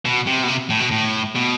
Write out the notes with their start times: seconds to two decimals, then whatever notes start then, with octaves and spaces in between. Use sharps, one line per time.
0.05 B2
0.27 C3
0.43 B2
0.48 C3
0.70 A2
0.80 B2
0.91 A2
1.35 B2